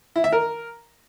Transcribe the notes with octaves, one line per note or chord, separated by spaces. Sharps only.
E4
E5
A#4